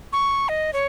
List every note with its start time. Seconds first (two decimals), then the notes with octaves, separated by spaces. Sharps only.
0.12 C#6
0.49 D#5
0.73 C#5